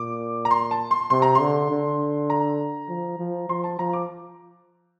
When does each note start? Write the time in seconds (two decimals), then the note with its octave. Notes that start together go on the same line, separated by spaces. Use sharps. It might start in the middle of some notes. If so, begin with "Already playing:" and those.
Already playing: A#2 D6
0.45 A#5
0.51 C6
0.71 A5
0.91 C6
1.10 C3 C6
1.22 A#5
1.35 C6
1.40 D3
1.70 D3
2.30 A#5
2.89 F3
3.19 F3
3.49 F3 C6
3.64 A5
3.79 F3 A#5
3.93 D6